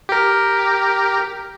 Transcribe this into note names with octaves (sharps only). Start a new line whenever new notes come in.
G4 A#4